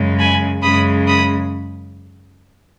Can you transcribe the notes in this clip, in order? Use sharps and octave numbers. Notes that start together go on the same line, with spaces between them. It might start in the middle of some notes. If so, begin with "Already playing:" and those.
Already playing: F#2 C#3 G#3
G#5 B5
F#2 C#3 G#3 B5 D#6
B5 D#6